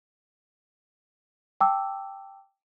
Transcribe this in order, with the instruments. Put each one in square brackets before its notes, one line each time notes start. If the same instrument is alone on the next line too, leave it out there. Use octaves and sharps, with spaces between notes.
[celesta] G5 A5 D6 E6